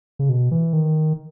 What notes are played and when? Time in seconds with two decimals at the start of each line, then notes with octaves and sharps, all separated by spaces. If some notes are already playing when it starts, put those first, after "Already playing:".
0.19 C#3
0.29 B2
0.51 E3
0.73 D#3